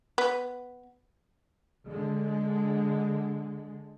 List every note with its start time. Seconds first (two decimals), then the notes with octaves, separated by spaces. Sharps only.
0.18 B3
1.87 D3 G#3